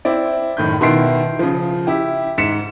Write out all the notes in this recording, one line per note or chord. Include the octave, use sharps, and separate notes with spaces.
C4 E4 D5
F#1 A2 D#3 G6
B2 D#3 E4 C6 C7 D7
C#3 F3
E4 G4
G#2 B6 C#7 E7